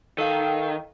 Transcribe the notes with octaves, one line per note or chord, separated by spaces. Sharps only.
D#3 A4 F5